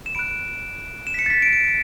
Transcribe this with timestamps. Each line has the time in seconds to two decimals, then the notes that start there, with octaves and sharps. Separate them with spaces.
0.06 E7
0.15 B5 F#6 D7
1.07 E7
1.14 B6
1.19 C#7
1.26 A6
1.30 B6
1.42 D7
1.53 D7